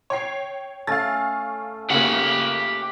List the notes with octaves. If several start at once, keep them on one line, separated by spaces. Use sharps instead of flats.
C#5 G5 C7
A3 C#4 F5 A6
C#3 A#3 G4 F#5